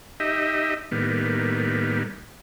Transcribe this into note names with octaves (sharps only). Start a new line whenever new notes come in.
D#4 G4 D#5 E5
A2 D#3 G3 A#3 B3